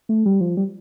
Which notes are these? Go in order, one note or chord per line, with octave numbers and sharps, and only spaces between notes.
A3
G3
F3
G3